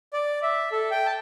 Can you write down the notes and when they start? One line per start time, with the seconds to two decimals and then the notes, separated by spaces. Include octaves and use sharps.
0.13 D5
0.43 E5
0.72 A4
0.91 G5
1.06 A5